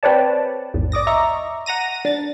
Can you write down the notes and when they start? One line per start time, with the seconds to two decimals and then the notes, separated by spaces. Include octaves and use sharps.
0.03 C4 G4 B4 C#5 D5 A5
0.74 A#1 E2 G#2
0.92 D5 D6 D#6 A#6
1.07 D#5 E5 A#5 C#6
1.66 F#5 A#5 A#6 D#7
2.05 D4 A6